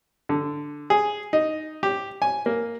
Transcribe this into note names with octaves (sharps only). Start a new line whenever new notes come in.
D3
G#4
D#4
G4
G#5
A#3